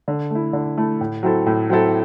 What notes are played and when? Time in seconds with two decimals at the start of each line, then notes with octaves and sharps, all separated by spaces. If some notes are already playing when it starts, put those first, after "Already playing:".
0.08 D3
0.30 A3 E4
0.53 D3
0.77 A3 E4
1.01 A2
1.23 F#3 C4 E4 A4
1.46 A2
1.70 F#3 C4 E4 A4